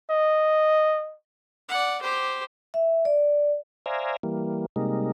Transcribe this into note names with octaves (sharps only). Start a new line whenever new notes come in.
D#5
D5 F#5
G4 C5
E5
D5
C5 D5 E5 F5 G#5 A#5
E3 G3 A#3
C3 G3 G#3 A#3 D#4